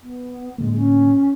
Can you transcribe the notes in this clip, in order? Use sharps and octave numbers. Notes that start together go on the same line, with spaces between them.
B3
A2 D3 G#3 A#3
C#4